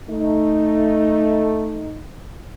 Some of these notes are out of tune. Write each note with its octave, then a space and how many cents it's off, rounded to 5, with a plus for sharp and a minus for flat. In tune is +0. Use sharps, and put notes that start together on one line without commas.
A3 +0 D#4 +0